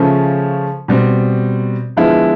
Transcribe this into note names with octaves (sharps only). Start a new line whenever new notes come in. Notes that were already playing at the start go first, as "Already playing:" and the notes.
Already playing: C#3 F3 A3 C#4
B2 G3 C4
D3 F3 G#3 B3 E4